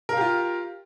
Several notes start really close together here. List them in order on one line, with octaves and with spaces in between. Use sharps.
A#4 F5 G4 F4